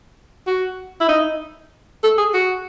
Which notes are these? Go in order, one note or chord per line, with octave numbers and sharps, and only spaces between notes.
F#4
E4
D#4
A4
G#4
F#4